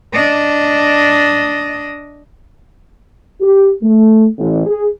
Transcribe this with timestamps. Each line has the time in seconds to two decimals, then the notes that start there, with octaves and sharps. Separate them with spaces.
0.13 D4 D#5
3.41 G4
3.83 A3
4.38 A1
4.66 G#4